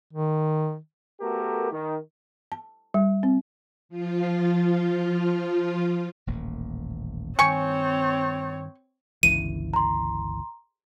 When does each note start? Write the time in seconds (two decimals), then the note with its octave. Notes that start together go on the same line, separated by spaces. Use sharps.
0.13 D#3
1.21 A3 B3 F#4 G4 A4 A#4
1.72 D#3
2.52 A5
2.94 G3
3.23 C4
3.89 F3 F4
6.27 D#1 A1 A#3
7.39 G2 D#3 C4 C#5 G5 G#5 C#6
9.23 G1 C#2 E3 D#7
9.74 A#5 C6